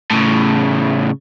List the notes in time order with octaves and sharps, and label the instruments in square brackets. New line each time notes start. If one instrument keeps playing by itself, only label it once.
[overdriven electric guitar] A2 C#3